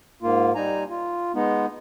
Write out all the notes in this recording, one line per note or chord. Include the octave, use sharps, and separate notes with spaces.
G#2 A#3 F4
G3 D#4 G#5 A#5
F4
G#3 B3 D#4